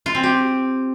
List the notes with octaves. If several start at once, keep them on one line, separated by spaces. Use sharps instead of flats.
F4
C4
G4